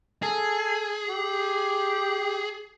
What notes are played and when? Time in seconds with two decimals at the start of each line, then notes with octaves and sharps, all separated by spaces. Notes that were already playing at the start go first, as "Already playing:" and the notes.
0.22 G#4 A4
1.10 G4